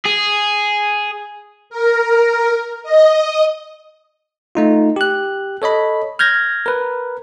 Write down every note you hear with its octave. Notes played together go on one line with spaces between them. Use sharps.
G#4
A#4
D#5
A3 D#4 F4
G4 F#6
A4 C#5 D#5 B5
F6 G6 G#6 A#6
A#4 B4